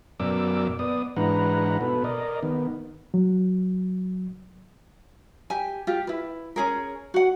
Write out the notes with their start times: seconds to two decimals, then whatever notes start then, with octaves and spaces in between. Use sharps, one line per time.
0.20 F#2 B2 A#4 D5 D6 E6
0.79 B3 D5 D#6
1.16 G#2 E3 D4 B4 F#5 A#5
1.81 B2 A4 B4
2.04 A#4 D5 D#5
2.43 D#3 B3
3.14 F#3
5.50 G4 G#5
5.87 F4 G4
6.07 E4 B4
6.56 C#4 G#4 A#4
7.14 F#4 F#5